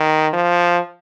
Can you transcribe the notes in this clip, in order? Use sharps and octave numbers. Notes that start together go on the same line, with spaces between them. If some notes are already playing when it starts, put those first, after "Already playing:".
Already playing: D#3
F3